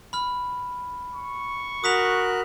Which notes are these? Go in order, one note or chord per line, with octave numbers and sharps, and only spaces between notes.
B5 F6
C#6
F#4 A#4 D#6 F#6 B6 F7